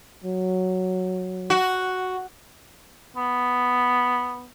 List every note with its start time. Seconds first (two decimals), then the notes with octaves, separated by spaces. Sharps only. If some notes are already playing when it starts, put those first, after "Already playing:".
0.24 F#3
1.50 F#4
3.16 B3